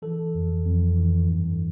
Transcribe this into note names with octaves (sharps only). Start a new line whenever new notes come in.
E3 A4
F2
F2
E3
G2